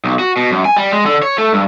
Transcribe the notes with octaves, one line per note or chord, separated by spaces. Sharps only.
B1
F#4
B2
F#2
G#5
G3
G#3
D3
C#5
A3
G2